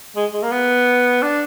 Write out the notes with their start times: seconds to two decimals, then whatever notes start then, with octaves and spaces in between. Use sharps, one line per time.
0.16 G#3
0.34 G#3
0.43 A#3
0.52 B3
1.22 D4